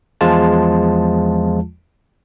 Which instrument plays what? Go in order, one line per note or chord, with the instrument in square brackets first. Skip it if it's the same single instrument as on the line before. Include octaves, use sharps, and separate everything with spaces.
[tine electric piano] E2 F3 G#3 F4 A5